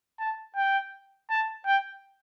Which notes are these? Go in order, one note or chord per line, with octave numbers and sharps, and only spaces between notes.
A5
G5
A5
G5